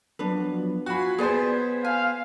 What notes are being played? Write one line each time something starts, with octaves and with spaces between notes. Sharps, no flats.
F3 F#3 B3 D4 B4
F4 F#4 G#5 B5 C7
B3 G#4 C5 D5 G#5 G#6 B6
F5 G#5